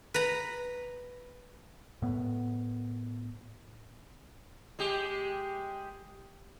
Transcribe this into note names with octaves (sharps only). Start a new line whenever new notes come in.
B4 A#5
A2 B3
G#3 G4